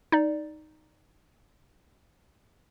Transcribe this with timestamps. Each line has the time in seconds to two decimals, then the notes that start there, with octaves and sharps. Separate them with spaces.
0.12 D#4 D5